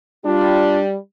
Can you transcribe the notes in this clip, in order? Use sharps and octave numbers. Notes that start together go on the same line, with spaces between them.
G3 D4 F4